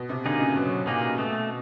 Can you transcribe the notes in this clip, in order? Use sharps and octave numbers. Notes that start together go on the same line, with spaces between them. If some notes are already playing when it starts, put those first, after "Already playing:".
Already playing: B2
C3
D3 A#3 D#4 G#4
C#3
B2 F#3
A#2 A#3 D#4 G#4
B2 A3